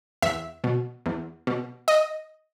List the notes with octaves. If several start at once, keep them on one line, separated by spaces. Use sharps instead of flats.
E2 E5
B2
E2
B2
D#5